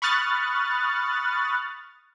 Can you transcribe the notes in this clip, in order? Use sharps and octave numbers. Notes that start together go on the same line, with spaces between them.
B5 C#6 D#6 F6 F#6 A6